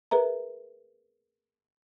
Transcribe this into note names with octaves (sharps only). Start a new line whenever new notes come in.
G#4 A#4 B4 E5 A#5